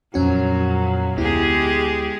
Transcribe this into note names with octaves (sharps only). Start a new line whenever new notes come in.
F2 A#2 F#3 C#4 F#4
D2 G#3 B3 E4 G4 G#4